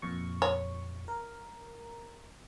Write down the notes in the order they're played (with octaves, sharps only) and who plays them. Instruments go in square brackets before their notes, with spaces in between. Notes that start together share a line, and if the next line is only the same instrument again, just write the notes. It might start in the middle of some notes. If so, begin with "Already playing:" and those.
[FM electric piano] F2 A#2 C#6
[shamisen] C#5
[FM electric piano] A#4